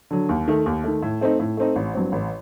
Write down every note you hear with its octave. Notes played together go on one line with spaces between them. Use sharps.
D3 F#3
D#2
D#3 A3
D#2
D#3 A3
A2
A3 C4 D#4
A2
A3 C4 D#4
A1
G2 F#3 C4
A1